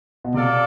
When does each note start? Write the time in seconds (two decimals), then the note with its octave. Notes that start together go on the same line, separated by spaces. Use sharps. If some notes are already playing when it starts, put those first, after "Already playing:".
0.24 B2
0.34 C3 F4 A4 D5